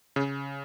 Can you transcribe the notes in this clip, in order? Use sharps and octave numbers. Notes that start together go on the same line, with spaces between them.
C#3